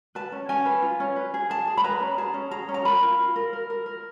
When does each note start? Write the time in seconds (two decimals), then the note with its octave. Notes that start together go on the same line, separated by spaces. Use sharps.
0.15 B4 A5
0.32 C#4
0.49 C#4 G#5
0.66 B4
0.82 F4
1.00 C#4
1.16 B4
1.34 G#4
1.50 G#4 A5
1.67 G#4
1.77 B5
1.84 B4 A#5
2.00 C#4
2.18 G#4 A5
2.34 C#4
2.51 G#4 A#5
2.69 C#4
2.74 A#5
2.85 A#4 B5
3.03 F4
3.19 F4
3.36 A#4
3.53 A#4
3.70 A#4
3.86 A#4